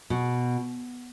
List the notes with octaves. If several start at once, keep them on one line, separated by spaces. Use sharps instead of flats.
B2